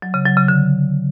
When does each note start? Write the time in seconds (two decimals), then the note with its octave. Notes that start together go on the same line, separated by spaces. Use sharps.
0.02 F#3
0.14 C#3
0.25 F#3
0.37 C#3
0.48 D3